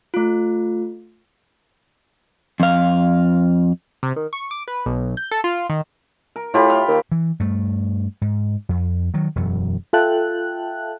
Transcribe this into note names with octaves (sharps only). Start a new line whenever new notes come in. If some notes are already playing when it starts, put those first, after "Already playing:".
A3 F4
F2 F5
C3
D#3
C#6
D6
B4
B1
G6
A4
F4
D#3
A#4
A2 F4 G4 B5
F5
D#2
E3
G2 A3
G#2
F2
D#3 F#3
E1 F#2
F4 A4 E5 G5 A5 F#6